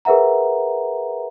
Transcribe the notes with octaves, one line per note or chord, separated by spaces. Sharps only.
G#4 A#4 B4 E5 F#5 A#5